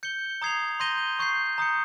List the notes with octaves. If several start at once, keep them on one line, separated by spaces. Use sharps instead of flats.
G6 C#7 G7
A#5 D#6 G#6 C7 F7
C6 G6 A#6 D#7 G7
C#6 G6 C7
A#5 D#6 G6 C#7